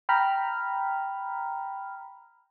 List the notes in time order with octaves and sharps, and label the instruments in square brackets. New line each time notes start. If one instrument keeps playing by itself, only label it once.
[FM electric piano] G5 A#5 B5 F6